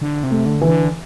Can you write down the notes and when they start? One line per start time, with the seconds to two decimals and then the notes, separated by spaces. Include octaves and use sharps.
0.02 D3
0.24 C3
0.31 A3
0.46 D3
0.61 E3
0.68 D3